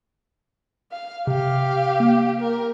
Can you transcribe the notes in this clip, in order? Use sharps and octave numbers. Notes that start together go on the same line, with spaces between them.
F5
C3 G4 F5
A#3
A#4